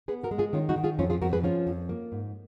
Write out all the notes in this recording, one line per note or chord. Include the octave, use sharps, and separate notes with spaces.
B3 G#4 B4
F#4 A#4
G#3
F4 G#4
D#3 C#4 F4
D#4 F#4
D#3
F4 G#4
F2 C#4 F4
F4 G#4
F2 F#4 A#4
G#4 B4
F3 C#4 F4
F2
A#3
G#2